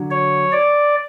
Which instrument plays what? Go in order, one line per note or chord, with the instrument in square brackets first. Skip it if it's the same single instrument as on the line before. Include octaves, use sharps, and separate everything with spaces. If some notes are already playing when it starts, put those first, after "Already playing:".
Already playing: [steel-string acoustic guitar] D3 F#3
[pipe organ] C#5
D5